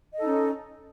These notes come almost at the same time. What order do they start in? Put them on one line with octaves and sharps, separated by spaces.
D#5 A4 D#4 C#4